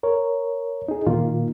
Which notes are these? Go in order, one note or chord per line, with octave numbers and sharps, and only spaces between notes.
A#4 C#5
D#4 G#4
A#2 D#3 A#3 F4